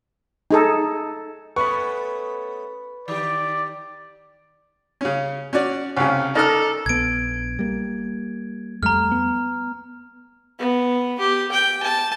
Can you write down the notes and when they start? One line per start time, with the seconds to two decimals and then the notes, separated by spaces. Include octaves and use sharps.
0.51 D#4 G#4 A4
1.56 A3 B3 C#4 B4 B5 C#6
3.08 D#3 G4 D5
5.01 C#3 C#4
5.53 C#4 F#4 D5
5.97 C2 C#3 C#4
6.35 D#4 A4 A#4 D5 A#5 F6
6.86 A#1 B3 G#6 D7
7.59 G3 A#3
8.83 F2 G3 A3 A#5 F6
9.12 B3
10.59 B3
11.20 G4
11.52 G5
11.83 A5